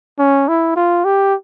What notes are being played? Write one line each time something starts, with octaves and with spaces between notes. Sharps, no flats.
C#4
E4
F4
G4